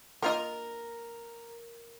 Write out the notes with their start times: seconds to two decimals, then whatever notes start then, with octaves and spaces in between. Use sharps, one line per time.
0.22 A#3 F4 A#4 D#5